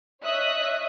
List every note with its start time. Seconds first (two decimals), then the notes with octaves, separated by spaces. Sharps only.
0.23 C#5 D#5 E5 D#6 F#6